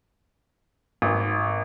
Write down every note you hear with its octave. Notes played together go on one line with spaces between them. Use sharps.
G#1